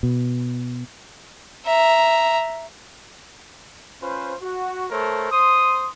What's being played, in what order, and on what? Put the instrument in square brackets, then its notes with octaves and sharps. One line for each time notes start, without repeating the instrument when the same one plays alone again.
[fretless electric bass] B2
[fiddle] E5 A#5
[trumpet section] C#4 F4 B4 C5
F#4
A3 A4 A#4 C5 C#5
C5 C6 D#6